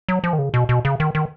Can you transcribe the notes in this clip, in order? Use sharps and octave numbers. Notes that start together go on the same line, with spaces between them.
F#3
F3
D#3
C#3
B2
B2
C#3
D#3
D#3